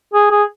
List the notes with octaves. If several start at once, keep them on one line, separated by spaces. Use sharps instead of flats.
G#4
G#4